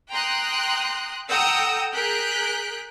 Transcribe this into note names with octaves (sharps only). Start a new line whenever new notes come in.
G5 A#5 C6 D#6 F#6
A4 F#5 G5 A#5 D#6 E6
G#4 A#4 F#6 G6 B6 D7